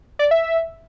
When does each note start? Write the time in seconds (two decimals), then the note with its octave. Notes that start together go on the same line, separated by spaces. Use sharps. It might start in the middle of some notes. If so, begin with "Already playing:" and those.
0.19 D5
0.31 E5